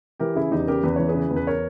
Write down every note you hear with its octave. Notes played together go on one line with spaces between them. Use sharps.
E3 G4 A#4
C#3 E4 G#4
E2 D#4 G4
C#3 G4 A#4
E2 B4
E3 C#5
G#4 B4
C#3
E2
B4
A#4 C#5